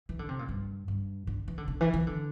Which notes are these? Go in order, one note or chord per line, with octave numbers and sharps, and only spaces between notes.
E3
D3
C3
A#2
G2
G2
D3
E3
D3
D3
E3
E3
D3